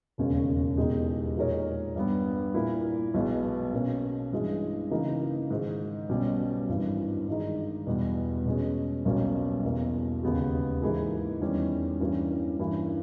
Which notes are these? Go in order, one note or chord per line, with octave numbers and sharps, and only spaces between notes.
E1 D#2 C#3 G#3 C#4
E2 B2 G#3 D#4 G4
A#2 G#3 D#4 A#4 C#5
G2 G3 B3
A#2 A#3 E4 A#4
B1 B2 G#3 B3
B2 A#3 C#4
G2 E3 G#3
C#3 E3 A#3 D#4
G#2 D#3 G#3
B1 B2 G3 C#4
G#1 G2 E3
G2 D#3 G#3 D#4
E2 B2 G3 B3
B2 G#3 C#4
B1 B2 G3 A#3 C#4
E2 B2 A#3
D#2 C#3 G#3 B3 G4
G#2 E3 A#3 E4 G#4
E2 D#3 G3 C#4
G2 E3 G3 A#3 C#4
G2 E3 A#3 C#4 E4